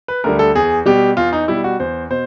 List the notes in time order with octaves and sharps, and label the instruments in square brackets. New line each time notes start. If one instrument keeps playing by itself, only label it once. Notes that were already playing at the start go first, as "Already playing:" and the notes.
[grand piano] B4
D2 D3 G3 A#4
A4
E2 G#4
B2 G3 G4
E2 F4
D#4
B2 G3 E4
F#4
E2 C5
B2 C5